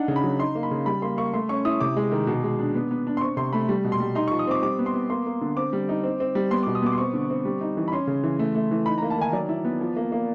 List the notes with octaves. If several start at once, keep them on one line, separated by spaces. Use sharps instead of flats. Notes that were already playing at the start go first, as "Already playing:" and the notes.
Already playing: D4 D#4 F#5
C#3
B5
F#3
D#4 C6
A#3
B5
C#3
G3 B5
A#3 C6
A#3 C#6
A3 C6
C#4 C#6
E4 D#6
C3 D6
G#3
D#3
B2
G#3
D4
B3
B3
D4
C6
C4 C#6
C3 C6
A3 B5
G3
B2
C6
G3
D#4 C6
C#6
F3
D#6
C4 D6
G3 D6
B3
C6
B3
A#3 C6
A#3
D3
C4 D6
G3
D#4
C4
C4
G3
B3 C6
D6
B2
D#6
B3 D6
C6
C4 C#6
D3
C4
G3
D#4
E3
B5
C#4 C6
C#3
E3
A3
A3
E3
D#4 B5
A#5
A#3
A5
D#3 G#5
F#3 D5
E4
B3
F3
A#3
A#3